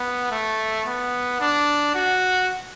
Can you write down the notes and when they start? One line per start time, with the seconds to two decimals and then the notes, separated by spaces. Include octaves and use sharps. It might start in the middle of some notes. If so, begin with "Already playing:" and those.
Already playing: B3
0.31 A3
0.86 B3
1.41 D4
1.95 F#4